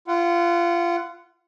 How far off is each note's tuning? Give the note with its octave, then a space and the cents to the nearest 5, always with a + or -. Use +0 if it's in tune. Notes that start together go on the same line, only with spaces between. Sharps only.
F4 -25 F#5 +0